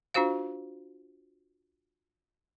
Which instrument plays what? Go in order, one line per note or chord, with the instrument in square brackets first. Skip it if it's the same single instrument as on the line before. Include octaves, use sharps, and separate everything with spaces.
[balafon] D4 F4 F#4 C5 F5